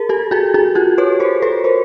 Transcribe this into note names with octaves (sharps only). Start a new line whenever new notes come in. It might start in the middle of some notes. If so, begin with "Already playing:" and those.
Already playing: G#4 A#4
G4 A4
F#4 G#4
F#4 G#4
F4 G4
B4 C#5
A#4 C5
A4 B4
A#4 C5